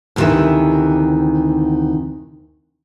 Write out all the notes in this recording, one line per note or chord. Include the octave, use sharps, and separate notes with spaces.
D2 A2 C3 D#3 E3 E5